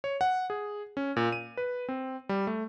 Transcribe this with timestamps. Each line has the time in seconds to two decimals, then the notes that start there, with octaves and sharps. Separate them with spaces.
0.04 C#5
0.21 F#5
0.50 G#4
0.97 C#4
1.16 A#2
1.32 D#7
1.57 B4
1.89 C4
2.29 G3
2.47 A3